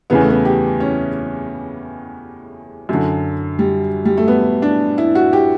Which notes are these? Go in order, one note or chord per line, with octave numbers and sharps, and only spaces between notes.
E2 C#3 E3 B3
A3
B3
G4
C#4
F#2 D3
G3
G3
A3
B3
D4
E4
F#4
G4